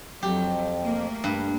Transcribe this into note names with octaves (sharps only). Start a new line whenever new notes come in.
F2 F#3 G4
A3 A#3
G2